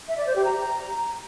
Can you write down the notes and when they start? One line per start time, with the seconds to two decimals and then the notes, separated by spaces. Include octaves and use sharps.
0.08 E5
0.18 D5
0.27 C5
0.36 G4
0.45 A#5